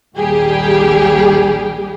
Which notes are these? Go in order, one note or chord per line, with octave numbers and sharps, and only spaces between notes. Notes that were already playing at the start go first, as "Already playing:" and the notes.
A#1 D#2 G3 A#3 G4 G#4